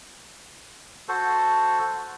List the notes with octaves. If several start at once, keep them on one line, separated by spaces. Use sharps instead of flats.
F#4 A4 C5